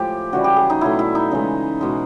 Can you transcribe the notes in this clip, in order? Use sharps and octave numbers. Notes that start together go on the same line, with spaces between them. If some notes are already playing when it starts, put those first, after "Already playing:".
Already playing: A2 F3 G#3 G4
C#3 E3 G3 F#4
G4
G#4
D#4
B2 F#3 A3 E4
E4
D#4
C#3 E3 G#3
B2 G#3